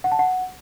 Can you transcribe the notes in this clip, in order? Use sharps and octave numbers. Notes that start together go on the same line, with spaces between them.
F#5
A5
F#5